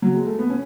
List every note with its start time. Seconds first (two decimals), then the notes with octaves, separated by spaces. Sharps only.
0.02 F#3
0.14 G#3
0.26 A3
0.38 B3
0.50 C#4